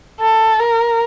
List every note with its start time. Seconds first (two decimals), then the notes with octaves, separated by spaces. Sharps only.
0.20 A4
0.60 A#4